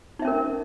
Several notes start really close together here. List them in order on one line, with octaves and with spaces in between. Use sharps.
D#4 E5 C#4 A#4